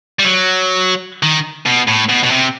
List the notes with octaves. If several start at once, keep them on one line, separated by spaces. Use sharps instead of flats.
G3
F#3
D#3
B2
A2
B2
B2
C3